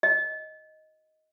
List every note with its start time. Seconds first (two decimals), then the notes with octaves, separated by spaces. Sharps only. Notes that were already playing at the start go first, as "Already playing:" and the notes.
0.03 D#5